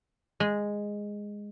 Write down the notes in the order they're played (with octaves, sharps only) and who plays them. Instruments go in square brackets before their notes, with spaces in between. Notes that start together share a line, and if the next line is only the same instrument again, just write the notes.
[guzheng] G#3